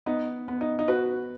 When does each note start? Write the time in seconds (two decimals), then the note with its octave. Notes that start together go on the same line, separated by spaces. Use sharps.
0.06 B3 D#4
0.48 B3
0.61 D#4
0.79 D#4
0.88 F#4 B4